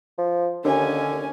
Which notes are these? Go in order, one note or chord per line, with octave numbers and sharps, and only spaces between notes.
F3
D#2 D3 C#4 G#5